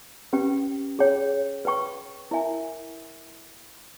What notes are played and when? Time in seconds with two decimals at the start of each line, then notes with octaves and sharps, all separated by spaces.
0.33 C#4 G4 B4 G5
0.99 G#4 C#5 G5
1.65 B4 G5 C#6
2.31 E4 A#4 E5 G#5